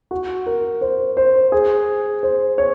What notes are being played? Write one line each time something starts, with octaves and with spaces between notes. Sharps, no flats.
F#4
A#4
C5
C5
G#4
C5
C#5